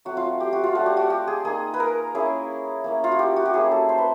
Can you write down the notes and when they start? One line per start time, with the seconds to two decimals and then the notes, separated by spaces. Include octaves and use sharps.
0.05 F#3 A3 C4 F#4
0.17 F4
0.40 G4
0.53 F#4
0.63 F4
0.75 A3 D4 F4 F#4
0.86 G4
0.97 F#4
1.10 G4
1.27 G#4
1.45 A#3 D#4 G#4
1.74 B4
1.80 A#4
2.15 A#3 C#4 E4 G#4
2.84 A#3 C#4 E4
3.04 F4
3.12 F#4
3.19 G4
3.36 F#4
3.46 G4
3.54 A#3 C#4 E4 G#4
3.71 A4
3.89 C5
3.98 B4